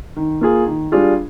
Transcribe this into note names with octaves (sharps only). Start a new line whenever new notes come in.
D#3
A#3 F4 G#4
D#3
G3 D4 F4 G#4